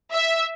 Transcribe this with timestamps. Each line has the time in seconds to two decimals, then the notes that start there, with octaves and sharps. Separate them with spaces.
0.14 E5